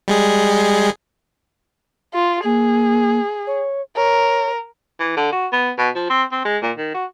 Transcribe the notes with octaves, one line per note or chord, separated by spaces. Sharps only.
G3 G#3 G#4
F4
A#3 G#4
C#5
A#4 C#5
E3
D3
F#4
B3
B2
F3
C4
C4
G#3
A#2
D#3
F#4